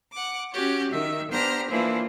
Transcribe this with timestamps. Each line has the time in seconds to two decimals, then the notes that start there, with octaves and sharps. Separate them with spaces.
0.11 F#5 D6
0.52 C#4 F#4 G4 C#5
0.92 D#3 E5
1.32 B3 D4 G4 C5 A#5 F6
1.71 E3 F3 A#3 D4 E4 F4